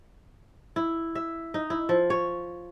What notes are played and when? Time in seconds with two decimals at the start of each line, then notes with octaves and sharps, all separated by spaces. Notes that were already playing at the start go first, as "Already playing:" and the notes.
0.76 E4
1.15 E5
1.54 D#4
1.70 E4
1.89 F3
2.10 C#5